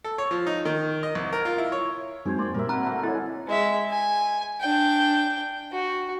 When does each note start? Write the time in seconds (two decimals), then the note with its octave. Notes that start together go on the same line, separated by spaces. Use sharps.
0.04 A4
0.18 C#5
0.31 F3
0.47 D#4
0.65 D#3
1.03 D#5
1.15 C2
1.33 A#4
1.45 F4
1.58 E4
1.72 C#5
2.25 F#2 G#3 C4 D#4 F#4 G#4 C5 G#6
2.39 A#3 D5 G5 C6
2.54 A#2 G3 A#3 A#4 E5
2.69 C4 F#4 A#5 B5 F6 F#6
2.83 D3 E3 A3
3.03 G#3 E4 G#4 A4 C#5
3.48 G#3 E5
3.91 G#5
4.60 D4 G5
5.72 F#4